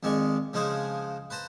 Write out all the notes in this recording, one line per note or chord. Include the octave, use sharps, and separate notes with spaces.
F2 D#3 G#3 D5 C#6
C#3 F3 G#3 D#4 G#4 C5
B4 C5 A5 A#5